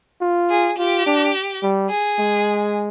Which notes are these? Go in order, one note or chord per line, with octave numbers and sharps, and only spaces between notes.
F4
G#4
F4 G4
D4
G3
G#4
G#3